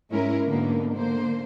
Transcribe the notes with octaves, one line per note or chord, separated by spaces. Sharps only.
G#2 G#3 C#4 E4 A#4
G#2 B2 D3 A#3 B3
D3 A#3 C5